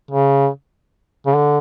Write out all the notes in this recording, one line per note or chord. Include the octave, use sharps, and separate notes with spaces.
C#3
C#3
D3